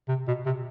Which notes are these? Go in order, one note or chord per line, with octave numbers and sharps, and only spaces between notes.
C3
B2
C3